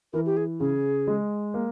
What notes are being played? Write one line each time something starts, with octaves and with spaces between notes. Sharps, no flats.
E3 A#4
G4
G#4
C#3 G#4
G#3
A#3